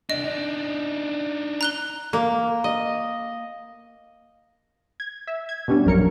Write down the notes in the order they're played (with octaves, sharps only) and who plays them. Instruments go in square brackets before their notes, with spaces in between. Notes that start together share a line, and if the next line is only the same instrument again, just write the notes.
[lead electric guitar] C3 D4 [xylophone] D#5
[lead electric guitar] D4 D#4
[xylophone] A#5 F#6 G7
[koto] A#3
D#5
[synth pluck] G#6
E5
G#6
B2 G3 C#4 D4
A#1 F#2 A#4 C#7